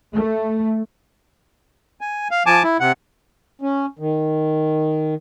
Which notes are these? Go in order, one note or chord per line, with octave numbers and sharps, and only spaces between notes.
A3
G#5
F5
F3 G#5 A5 D6
E4
C3 F#5
C#4
D#3